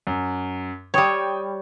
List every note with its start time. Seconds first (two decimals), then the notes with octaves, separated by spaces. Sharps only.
0.07 F#2
0.94 G3 C#5 G5 D#6